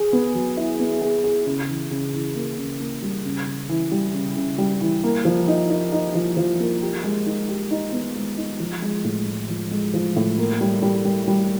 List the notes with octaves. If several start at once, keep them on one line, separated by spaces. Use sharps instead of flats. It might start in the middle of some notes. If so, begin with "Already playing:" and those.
Already playing: G#4
B3
F#3
E4
B3
G#4
G#4
C#3
E3
C#3
E3
A#3
C#3
A#3
G3
C#3
C#3
E3
G3
C#3
C#3
G3
E3
A#3
F3
D#4
D#4
D#4
F3
F3
A#3
G4
G#3
D#4
G4
D#4
B3
G#3
D#4
F3
G#3
A2
G#3
F3
G#3
F3
A2
A#3
G3
G3
G3
G3